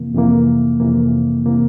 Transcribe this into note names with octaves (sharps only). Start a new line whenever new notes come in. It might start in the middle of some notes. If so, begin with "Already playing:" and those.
Already playing: F2 C3 E3 A#3
F2 C3 E3 A#3
F2 C3 E3 A#3
C3 E3 A#3